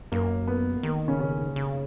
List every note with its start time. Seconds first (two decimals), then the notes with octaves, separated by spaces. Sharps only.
0.12 F#2 A#3
0.47 B3
0.83 D#3 A#3
1.08 C#3 C#4
1.20 C#3 C#4
1.56 C#3